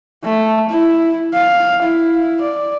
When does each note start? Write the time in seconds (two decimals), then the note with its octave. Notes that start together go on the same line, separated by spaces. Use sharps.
0.24 A3
0.70 E4
1.34 F5
1.83 E4
2.41 D5